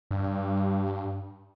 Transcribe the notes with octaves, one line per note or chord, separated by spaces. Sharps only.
G2